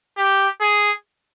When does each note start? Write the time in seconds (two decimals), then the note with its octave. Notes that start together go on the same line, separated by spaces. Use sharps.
0.18 G4
0.61 G#4